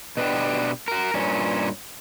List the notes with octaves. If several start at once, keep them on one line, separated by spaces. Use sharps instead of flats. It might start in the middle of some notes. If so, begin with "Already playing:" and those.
B2 B3 D4 G4
F#4 A#4
G2 A#2 C#4